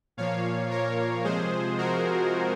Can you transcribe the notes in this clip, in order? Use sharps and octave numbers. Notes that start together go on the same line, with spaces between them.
A#2 F3 A#3 C#5 F5
A#4 C#5
C3 F3 G#3 G#4 C5
F#4 A#4